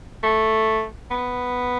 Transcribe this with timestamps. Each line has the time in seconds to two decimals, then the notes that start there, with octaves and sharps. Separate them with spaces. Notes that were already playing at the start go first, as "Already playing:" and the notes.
0.23 A3
1.11 B3